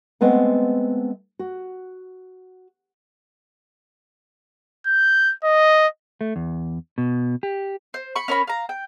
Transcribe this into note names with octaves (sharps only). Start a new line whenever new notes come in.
G#3 A3 B3 C4 F#5
F#4
G6
D#5
A3
E2
B2
G4
C5
B5 C#6
C#4 A#4 C#5 B5
F5 A#5
G5